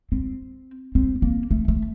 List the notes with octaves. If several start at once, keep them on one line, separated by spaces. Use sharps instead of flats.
C4
C4
A#3
A3
A3